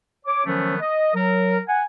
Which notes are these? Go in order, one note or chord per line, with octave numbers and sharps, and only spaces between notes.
C#5 D6
D#3 F3 F#3 A3 B3 C#4
D#5
F#3 A#4
F#5 G#5